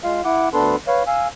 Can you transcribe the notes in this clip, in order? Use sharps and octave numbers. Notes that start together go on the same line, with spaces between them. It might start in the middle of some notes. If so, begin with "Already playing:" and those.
G#3 F4 F5
E4 F#5 D6
D2 B3 D4 A4 B4 C6
B4 C#5 F5
F5 G#5 E6